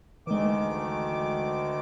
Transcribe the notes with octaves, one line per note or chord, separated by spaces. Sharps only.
D2 D#3 E3 G#3 D6